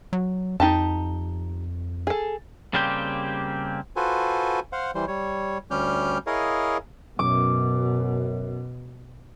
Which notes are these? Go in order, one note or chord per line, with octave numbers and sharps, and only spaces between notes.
F#3
F2 D#4 G4 A5
G#4 A4
C#3 G3 A#3 C4 G4
F4 F#4 A4 B4 C5 G#5
C5 F5 F#5
E3 G3 C5
G3 C#5
D2 G3 C#4 G4 F6 G6
E4 G#4 A#4 C#5 D#5 F5
F#2 B2 D6